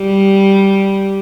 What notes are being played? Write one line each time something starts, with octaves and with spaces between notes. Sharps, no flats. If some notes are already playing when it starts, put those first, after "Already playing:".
Already playing: G3